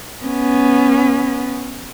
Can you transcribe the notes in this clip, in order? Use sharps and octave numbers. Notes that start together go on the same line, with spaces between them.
B3 C#4